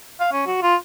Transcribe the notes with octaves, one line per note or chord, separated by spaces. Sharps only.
F5
C#4
F#4
F4